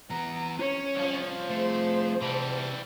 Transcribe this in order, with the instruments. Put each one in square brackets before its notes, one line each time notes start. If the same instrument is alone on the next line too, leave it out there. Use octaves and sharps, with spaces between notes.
[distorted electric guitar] E3 B3 [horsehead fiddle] A#5
[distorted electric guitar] C#4 [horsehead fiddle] C#5
[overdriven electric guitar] C2 F3
[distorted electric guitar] A3 E5 [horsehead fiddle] G#4 C5
[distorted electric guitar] C3 A5 [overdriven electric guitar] E3 G3